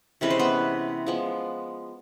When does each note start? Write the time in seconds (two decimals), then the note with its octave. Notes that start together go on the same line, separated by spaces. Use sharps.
0.21 C3 E3 G#3 C#4 B4
0.30 C5
0.39 B3 B4
1.06 F3 G#3 B3